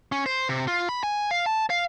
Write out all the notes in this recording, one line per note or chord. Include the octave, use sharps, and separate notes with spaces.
C#4
C5
C3
F4
B5
G#5
F5
A5
F5